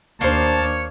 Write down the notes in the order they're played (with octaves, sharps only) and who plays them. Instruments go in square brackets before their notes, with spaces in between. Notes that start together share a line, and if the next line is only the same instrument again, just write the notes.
[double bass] D#2 D4 [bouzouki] A#3 C5 [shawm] C#5 [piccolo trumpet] A5